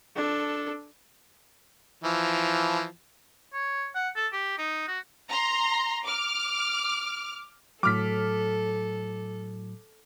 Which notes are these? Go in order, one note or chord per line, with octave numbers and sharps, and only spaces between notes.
D4 A4
E3 F3
C#5
F#5
A4
G4
D#4
F#4
A#5 C6
D6 F6
A2 F#3 A4 D6 F6 B6